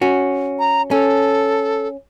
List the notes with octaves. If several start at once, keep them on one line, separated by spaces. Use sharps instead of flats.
C#4 F#4
A#5
C#4 A4